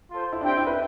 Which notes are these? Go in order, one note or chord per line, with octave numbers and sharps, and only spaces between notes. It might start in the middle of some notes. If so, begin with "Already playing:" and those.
F4 A4 C5
E4
C4 D4 G4 C5 G5
E4
B4